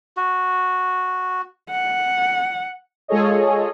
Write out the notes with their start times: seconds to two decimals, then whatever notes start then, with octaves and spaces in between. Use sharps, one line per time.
0.17 F#4
1.70 F#5
3.08 G#3 F4 G#4 A4 C#5 D#5